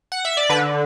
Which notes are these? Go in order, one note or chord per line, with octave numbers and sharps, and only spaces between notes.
F#5
E5
D5
D3 B4